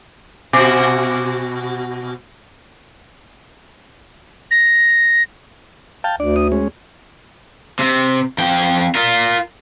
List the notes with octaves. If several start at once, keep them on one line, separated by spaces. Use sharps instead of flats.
B2 F#4
A#6
F5 G5 A5
D2 D4 D5
D4 D#6
G#3 C#4
C3
F2 G5
F4 A#4